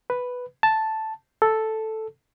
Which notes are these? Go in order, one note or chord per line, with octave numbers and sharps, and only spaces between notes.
B4
A5
A4